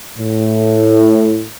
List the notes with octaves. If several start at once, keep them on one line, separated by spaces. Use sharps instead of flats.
A2